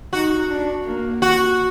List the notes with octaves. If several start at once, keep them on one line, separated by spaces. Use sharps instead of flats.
D#4 F#4
D4
A#3
F#4